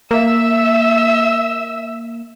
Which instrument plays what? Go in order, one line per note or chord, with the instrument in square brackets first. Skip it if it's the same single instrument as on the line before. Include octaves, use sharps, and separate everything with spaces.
[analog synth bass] A#3 [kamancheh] E5 E6